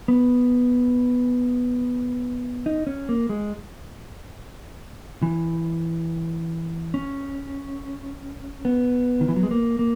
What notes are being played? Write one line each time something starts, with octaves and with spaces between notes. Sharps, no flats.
B3
D#4
C#4
A#3
G#3
E3
C#4
B3
D#3
E3
F#3
G#3
A#3
A#3